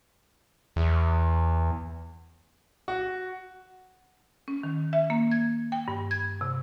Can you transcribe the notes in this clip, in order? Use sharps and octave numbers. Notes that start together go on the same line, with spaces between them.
E2
F#4
C#4
D#3
E5
A#3
G#6
G5
G2
G#6
C3